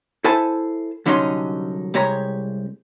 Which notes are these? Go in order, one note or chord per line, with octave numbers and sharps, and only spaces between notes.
E4 A4 C5 G#5 A5
C2 D3 F#3 C#4 D#4 C6
C2 G#3 G4 C#5 A#5